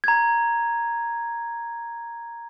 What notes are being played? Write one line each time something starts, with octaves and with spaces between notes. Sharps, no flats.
A#5 G#6